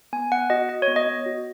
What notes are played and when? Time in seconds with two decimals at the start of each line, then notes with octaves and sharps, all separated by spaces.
0.13 B3 G#5
0.32 B3 F#5
0.50 F#4 D#5
0.69 F#4 D#5
0.82 C#5
0.88 B3
0.96 D#5
1.07 B3
1.26 F#4